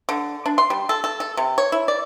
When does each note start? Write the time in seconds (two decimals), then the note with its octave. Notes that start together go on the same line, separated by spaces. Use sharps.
0.09 D3
0.46 D4
0.58 C6
0.70 G3
0.89 A4
1.04 A4
1.20 A4
1.37 C3
1.58 C#5
1.72 E4
1.88 D5